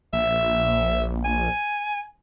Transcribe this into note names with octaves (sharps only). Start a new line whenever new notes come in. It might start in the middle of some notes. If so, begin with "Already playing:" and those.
A#1 E5
G#5